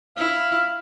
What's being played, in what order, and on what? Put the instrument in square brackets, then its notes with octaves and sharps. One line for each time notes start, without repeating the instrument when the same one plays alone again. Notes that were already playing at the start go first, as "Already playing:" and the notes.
[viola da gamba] E4 [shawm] F5